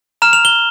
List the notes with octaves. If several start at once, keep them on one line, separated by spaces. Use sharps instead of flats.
A#5 F6 E7
F7
G7